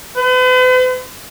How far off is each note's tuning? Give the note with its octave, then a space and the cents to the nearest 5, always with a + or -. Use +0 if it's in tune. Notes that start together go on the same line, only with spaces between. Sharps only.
B4 +45